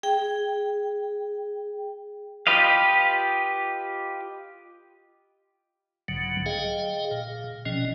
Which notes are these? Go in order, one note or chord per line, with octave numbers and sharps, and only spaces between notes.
G#4 G5
F4 G4 B4 D#5 F5
B1 G#2 D3 F#3
G#4 D#5 F5 G5
A#2
G1 B2 F3 C#4 D#5